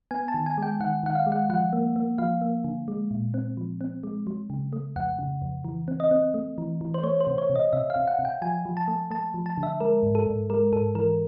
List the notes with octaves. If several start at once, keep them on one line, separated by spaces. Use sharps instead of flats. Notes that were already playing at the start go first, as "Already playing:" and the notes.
B3 G#5
A5
D#3
G#5
G#3 G5
D#3 F#5
D#3 F#5
F5
G#3
F#5
F3 F#5
A#3
A#3
F3 F5
A#3
D3
G#3
A#2
C4
F3
C4
G#3
F#3
C#3
A3
F2 F#5
C#3
F2
E3
C4
D#5
C4
A3
E3
E3
C5
A3 C#5
C5
C3
C#5
C3
D#5
C3 E5
F5
C3
F#5
C3
G5
F3 G#5
F3
A5
A3
A3 A5
F3
A5
D3
E5
G#3 A#4
G#2
A4
G#2
G#3 A#4
G#2 A4
E3 A#4